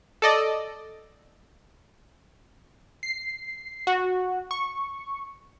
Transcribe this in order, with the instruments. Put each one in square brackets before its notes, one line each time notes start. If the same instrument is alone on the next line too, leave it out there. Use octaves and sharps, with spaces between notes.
[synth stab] A4 D5 D#5
[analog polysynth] C7
F#4
C#6